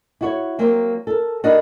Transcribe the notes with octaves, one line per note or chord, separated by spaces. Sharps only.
E4 F#4 C#5
F#3 A#3 C4
A4 A#4
D4 D#4 F#4 A#4 B4 D#5